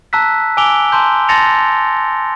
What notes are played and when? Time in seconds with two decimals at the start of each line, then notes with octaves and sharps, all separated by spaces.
0.13 A5 A#5 E6 F#6 B6
0.57 G#5 D6 E6 D7 F7 G7
0.92 A5 A#5 C6 G6
1.29 A5 C6 A6 A#6 C#7 F7